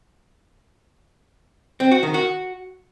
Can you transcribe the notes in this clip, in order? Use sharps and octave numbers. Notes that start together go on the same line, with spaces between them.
C4
F#4
D#3
F#4